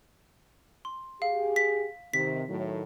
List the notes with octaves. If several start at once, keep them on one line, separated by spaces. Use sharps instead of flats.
C6
G4 G#4 F5
B6
C3 D#3 B6
A2 D#3 F#3